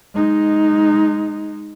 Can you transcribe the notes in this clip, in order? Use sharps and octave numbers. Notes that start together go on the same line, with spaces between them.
G#3 D#4